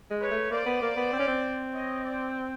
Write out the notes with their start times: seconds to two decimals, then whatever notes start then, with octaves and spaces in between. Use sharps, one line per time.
0.10 G#3
0.20 B4 C#5
0.31 A3
0.51 A#3 C5 D5
0.66 B3
0.82 A#3
0.96 B3
1.12 C4
1.19 C#4
1.28 C4
1.72 C#5 D#5
2.03 C5 D5